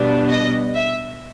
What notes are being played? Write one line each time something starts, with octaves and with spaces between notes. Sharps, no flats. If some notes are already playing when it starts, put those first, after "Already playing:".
Already playing: B2 G3 B3 D4
D#5
E5